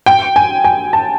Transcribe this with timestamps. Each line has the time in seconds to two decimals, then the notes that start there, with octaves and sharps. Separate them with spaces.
0.06 G5
0.36 G#5
0.64 G#5
0.93 A5